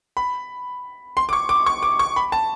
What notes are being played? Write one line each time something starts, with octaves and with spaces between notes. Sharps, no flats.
B5
C6
D6
C#6
D6
C#6
D6
C#6
B5
A5